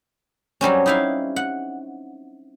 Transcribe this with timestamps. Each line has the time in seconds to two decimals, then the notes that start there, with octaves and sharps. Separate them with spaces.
0.61 F#3 G3 C4 C#4
0.86 D#4 E4 F5
1.36 F#5